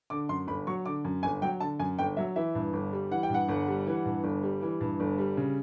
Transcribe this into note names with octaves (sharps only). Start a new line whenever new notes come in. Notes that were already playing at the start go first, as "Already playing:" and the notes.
D3 D6
F#2 C6
G1 B5
F#3 C#6
D3 D6
F#2
G1 G#5
F#3 G5
D3 A5
F#2 G#5
G1 G5
F#3 E5
E3 E5
G2
G1
G3
E3 F#5
G5
G2 F#5
G1
G3
E3
G2
G1
G3
E3
G2
G1
G3
C#3